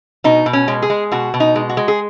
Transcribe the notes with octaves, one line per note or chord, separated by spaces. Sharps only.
B2 D#4
B2
C#4
G#3
G#4
G#3
B2 F#4
B2
D#4
G#3
F#4
G#3
G#4